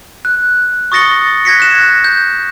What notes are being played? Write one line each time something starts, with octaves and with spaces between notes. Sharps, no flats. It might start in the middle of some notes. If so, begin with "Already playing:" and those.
F#6
C#6 D#6 A6 A#6 C#7 G7
F#6 G#6 A#6 B6 C#7
F#6 E7
G6